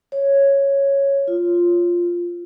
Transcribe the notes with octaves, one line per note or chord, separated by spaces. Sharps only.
C#5
F4